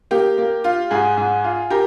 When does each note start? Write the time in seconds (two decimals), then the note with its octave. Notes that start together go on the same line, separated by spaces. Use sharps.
0.11 A#3 G4
0.38 A#3
0.64 F4
0.90 G#2 G#4
1.17 G#2
1.44 F4
1.70 G4 A#4